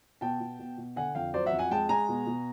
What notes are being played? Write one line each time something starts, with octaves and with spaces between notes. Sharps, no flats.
B2 G5 A5
B2
B2
B2
D3 F#5 G#5
F2 F5 G5
F#3 C5 D5
E5 F#5
F2
F#5 G#5
G#3 G5 A5
G#3 G#5 A#5
B2
B2